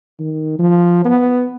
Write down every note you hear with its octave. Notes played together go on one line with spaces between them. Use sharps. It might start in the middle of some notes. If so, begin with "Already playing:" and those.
D#3
F3
B3